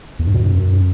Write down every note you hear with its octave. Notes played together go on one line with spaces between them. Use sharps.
E2
G2
B2
F#2